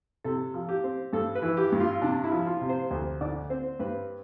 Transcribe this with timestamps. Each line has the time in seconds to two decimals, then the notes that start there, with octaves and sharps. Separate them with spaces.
0.24 C3 A4
0.54 F3
0.69 G4
0.84 C4
1.13 G2 A4
1.35 B4
1.42 E3
1.57 G4
1.72 G2
1.80 F4
2.02 C3 D4
2.24 E4
2.32 F3
2.46 F4
2.61 C3
2.69 C5
2.90 D2 C5
3.21 D3 D5
3.50 C4 C5
3.79 G2 B4